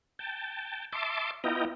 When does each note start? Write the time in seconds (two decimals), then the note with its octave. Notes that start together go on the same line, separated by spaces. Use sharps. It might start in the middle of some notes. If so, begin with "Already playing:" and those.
0.19 G5 A5
0.93 E5 A5 C6 D6
1.44 B3 E4 F4 D#5 G5 A#5